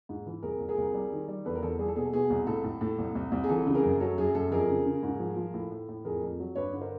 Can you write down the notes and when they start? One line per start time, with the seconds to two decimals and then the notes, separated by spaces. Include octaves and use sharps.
0.09 G#2
0.26 E3
0.43 C2 G#4 A#4
0.60 C2
0.68 G#4 A#4
0.78 C2
0.94 G3
1.12 D#3
1.28 G3
1.45 E2 A4 B4
1.55 A#4
1.62 E2 A4
1.79 G3 G#4
1.88 A4
1.96 B2 G#4
2.05 A4
2.13 B2 G#4
2.30 C2
2.47 A2 A4
2.64 A2
2.81 A2
2.98 C2
3.15 C2
3.32 C2
3.44 G#4
3.49 E3 A4
3.67 C#3
3.75 G#4 A#4
3.83 F#2
4.00 F#3 A4
4.18 F#2 G#4
4.35 F#2 A4
4.51 F2 G#4 A#4
4.69 C#3
4.85 C#3
5.03 G#2
5.19 F3
5.37 F3
5.54 A2
5.71 A2
5.89 A2
6.05 F2 G#4 A#4
6.21 F2
6.39 F#3
6.55 G2 B4 C#5
6.73 D3
6.81 A#4 C5